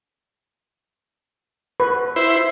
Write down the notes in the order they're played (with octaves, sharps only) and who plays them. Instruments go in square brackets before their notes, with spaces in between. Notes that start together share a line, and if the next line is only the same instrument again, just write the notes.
[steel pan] B4
[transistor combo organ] E4 C5